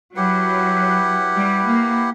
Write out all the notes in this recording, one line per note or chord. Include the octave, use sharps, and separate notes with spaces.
F#3 E4 G4 B4 F#5
G3
A#3